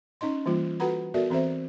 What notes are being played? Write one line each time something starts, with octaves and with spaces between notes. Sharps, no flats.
C#4 D#4 D#5 C6
E3 G3 A#3 F4
F#4 A4 B4 F#5 A#5 B5
B3 F#4 A4 A#4 D5 E5
E3 C4 A4 C5 E5